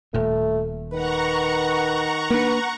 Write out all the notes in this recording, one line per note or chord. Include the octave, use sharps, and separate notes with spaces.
D#1 A#2 A3
D#3 B4 F#5 A#5 C#6
A#3 D4 B4